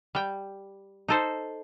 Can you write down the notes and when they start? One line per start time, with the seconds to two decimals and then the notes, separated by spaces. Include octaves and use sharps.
0.15 G3 G5
1.08 D#4 A4 C5